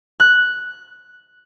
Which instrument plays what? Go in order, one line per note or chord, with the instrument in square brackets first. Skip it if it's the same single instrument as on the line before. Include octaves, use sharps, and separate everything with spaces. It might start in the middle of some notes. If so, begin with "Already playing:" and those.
[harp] F#6